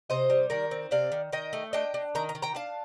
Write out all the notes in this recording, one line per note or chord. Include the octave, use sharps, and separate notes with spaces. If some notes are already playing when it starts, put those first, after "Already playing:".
C3 C5 D#5
G3
D#3 A#4 D5
C4
C3 D5 F5
D#3
D#3 D#5 G5
A3
D4 D#5 G5
D4
D#3 A#5
A#5
D#3
G5 A#5
D4 F5 A5